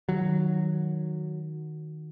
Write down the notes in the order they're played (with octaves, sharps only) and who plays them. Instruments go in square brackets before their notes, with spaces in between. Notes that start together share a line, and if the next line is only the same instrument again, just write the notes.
[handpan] D#3 F#4 [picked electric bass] F#3